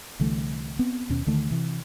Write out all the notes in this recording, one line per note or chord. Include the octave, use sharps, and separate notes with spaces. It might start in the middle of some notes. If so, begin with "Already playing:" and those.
C2 D3 E3 A3
B3 C4
D#2 B2 C#4
D2 D3 D#3 A3
C3 E3